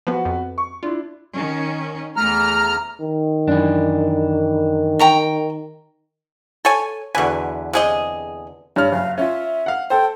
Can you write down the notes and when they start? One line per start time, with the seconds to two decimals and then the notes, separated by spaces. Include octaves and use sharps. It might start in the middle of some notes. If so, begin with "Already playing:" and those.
0.07 F3 B3 F#4 B4
0.25 F2
0.58 C#6
0.83 D4 E4 F4
1.33 D#3 C#4
2.17 E2 A3 A#5 F6
3.00 D#3
3.48 F#2 E3 D4
4.99 G5 A#5 C#6
6.65 A4 C#5 G#5
7.15 E2 B2 D3 B4 G#5
7.73 C3 G#4 D#5
8.76 G2 C#5 F6
8.92 F#1 F5
9.18 C#4 F4 E5
9.66 F5 F#5
9.90 A4 C5 G5